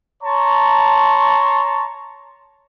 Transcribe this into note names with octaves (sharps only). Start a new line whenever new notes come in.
C#5 A5 A#5 C6 C#6